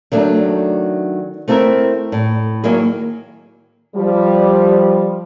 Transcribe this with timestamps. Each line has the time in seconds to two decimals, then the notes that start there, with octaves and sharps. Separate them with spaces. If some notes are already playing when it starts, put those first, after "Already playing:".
0.12 D#3 F#3 A3 D4
1.48 A3 C4 E4 G#4 A#4 E5
2.12 A2
2.64 D#3 F#3 A#3 E4 G#4
3.96 F3 G3